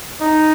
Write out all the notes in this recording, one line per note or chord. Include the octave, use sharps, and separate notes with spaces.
D#4